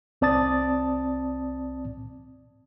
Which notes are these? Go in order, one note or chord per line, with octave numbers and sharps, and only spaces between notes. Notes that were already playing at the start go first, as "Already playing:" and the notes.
C2 C4 D5 A5 D#6 A6